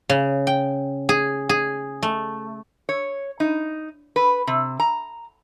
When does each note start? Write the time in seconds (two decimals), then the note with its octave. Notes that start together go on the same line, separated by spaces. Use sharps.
0.09 C#3
0.47 G5
1.09 G#4
1.49 G#4
2.03 A3
2.89 C#5
3.40 D#4
4.16 B4
4.47 C3
4.80 A#5